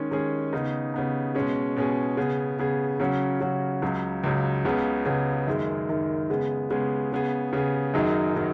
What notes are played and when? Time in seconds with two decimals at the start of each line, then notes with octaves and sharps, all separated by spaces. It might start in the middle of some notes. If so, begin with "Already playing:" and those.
Already playing: D#3 G#3 C#4 G#4
0.11 D#3 G#3 C#4 G#4
0.53 C#3 B3 D#4
0.94 C#3 B3 D#4
1.35 B2 G#3 C#4 G#4
1.76 B2 G#3 C#4 G#4
2.17 C#3 B3 G#4
2.59 C#3 B3 G#4
3.00 C#3 F#3 C#4 F#4
3.41 C#3 F#3 C#4 F#4
3.82 C#2 C#3 F#3
4.24 C#2 C#3 F#3
4.65 C#2 C#3 B3 G#4
5.05 C#2 C#3 B3 G#4
5.47 F#2 D#3 G#3
5.89 F#2 D#3 G#3
6.30 C#3 G#3 B3 G#4
6.70 C#3 G#3 B3 G#4
7.12 C#3 B3 G#4
7.53 C#3 B3 G#4
7.94 F#2 D#3 F#3 D#4 G#4
8.35 D#3 F#3 D#4 G#4